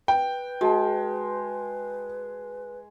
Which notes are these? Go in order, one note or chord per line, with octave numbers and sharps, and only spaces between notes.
B4 G5
G#3 F#4 A5